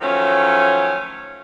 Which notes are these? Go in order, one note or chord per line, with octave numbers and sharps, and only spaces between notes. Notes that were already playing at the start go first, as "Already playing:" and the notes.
D#3 F3 F#3 A3 C#4